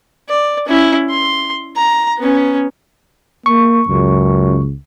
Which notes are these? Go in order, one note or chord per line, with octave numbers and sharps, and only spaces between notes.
D5
C#4 E4
C6
A#5
B3 C#4
A#3 C#6
C#2 F#2